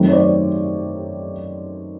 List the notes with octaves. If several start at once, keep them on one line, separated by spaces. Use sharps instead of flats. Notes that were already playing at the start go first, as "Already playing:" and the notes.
Already playing: F#2 D#3 F#3 A3 C4
C#5
C5 D5